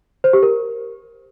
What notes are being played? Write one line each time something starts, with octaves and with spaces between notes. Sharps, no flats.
C5
G4
A#4